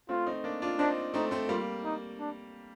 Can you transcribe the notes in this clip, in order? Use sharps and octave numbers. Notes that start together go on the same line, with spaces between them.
A3 C4 F4
C4 D#4
A#3 D4
D4 F4
C4 D4 D#4
A3 C4 D#4
A3 C4
G3 A#3 F4
D#4
D4